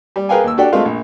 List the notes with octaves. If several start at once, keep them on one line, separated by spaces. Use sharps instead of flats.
G3
G#4 A#4 B4 F5 G5 G#5
D#2 E6
D4 F#4 G4 A4 D5 G5
G#3 A3 C4 F4 D#5 F5
A#1